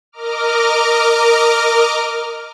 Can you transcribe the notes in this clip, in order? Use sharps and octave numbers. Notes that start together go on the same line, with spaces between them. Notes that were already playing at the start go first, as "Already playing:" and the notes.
A#4 D#5 A#5 D6 F6